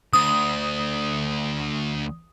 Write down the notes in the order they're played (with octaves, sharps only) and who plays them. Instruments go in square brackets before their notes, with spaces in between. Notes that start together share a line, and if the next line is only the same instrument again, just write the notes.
[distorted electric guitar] D2 [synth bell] D#6